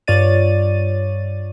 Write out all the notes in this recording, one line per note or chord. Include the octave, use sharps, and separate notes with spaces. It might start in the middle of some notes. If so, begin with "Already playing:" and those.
G2 F4 C#5 D5 A6 D#7